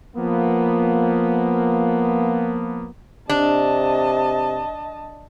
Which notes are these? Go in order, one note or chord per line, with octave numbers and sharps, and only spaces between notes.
F3 A#3 B3
C3 D4 D#5 A5